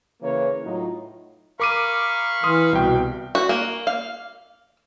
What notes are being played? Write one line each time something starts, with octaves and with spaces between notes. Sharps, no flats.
C#3 E3 A#3 B4 C#5
A2 F#3 D#4 F4
A#4 F5 B5 C#6 D6 D#7
E3 C6 D#6 F6
C2 B2 G5
F#4
A#3
F5